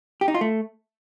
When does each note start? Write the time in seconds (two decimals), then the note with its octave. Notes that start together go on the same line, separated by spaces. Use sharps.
0.21 G4
0.28 D#4
0.34 F4
0.41 A3